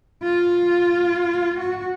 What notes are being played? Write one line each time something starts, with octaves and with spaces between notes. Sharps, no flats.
F4
F#4